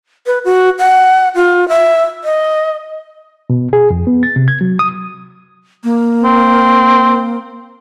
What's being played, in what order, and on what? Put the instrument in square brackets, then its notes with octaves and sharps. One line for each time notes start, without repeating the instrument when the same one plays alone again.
[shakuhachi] B4
F#4
F#5
F4
E5
D#5
[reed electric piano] B2
G#4
F2
B3
A6
C3
G#6
F#3
D#6
[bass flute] A#3
[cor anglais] C4